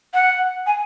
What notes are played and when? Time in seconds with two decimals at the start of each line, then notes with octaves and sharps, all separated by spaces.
0.14 F#5
0.66 G#5